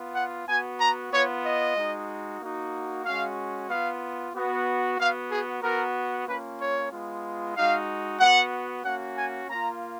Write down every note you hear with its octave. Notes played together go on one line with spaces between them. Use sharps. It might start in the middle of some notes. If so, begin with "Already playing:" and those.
Already playing: B3 F4
F#5
B3 F#4 G#5
A#5
B3 F4 C#5
D#5
G#3 D#4 F#4
A#3 D#4 F#4
G#3 C#4 F#4 F5
B3 F4 F5
B3 F#4
B3 F#4 F5
G#4
B3 F#4 A#4
A#3 C#4 F4 B4
C#5
G#3 B3 F4
G#3 D#4 F#4 F5
B3 F#4 F#5
A#3 C#4 F#4 F#5
G#5
A#3 F4 A#5